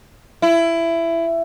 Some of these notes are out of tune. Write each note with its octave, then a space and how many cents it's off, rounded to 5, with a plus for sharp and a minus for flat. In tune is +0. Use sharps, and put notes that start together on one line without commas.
E4 +15